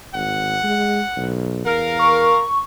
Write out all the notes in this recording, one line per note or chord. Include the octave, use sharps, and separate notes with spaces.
G#1 F#5
G#3
B1
E2 A#4 F5
C#6